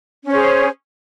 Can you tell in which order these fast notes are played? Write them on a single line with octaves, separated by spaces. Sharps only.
C#4 C5 C#5 G#4